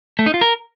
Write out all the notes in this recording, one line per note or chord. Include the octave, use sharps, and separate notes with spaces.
A3
D#4
F4
A#4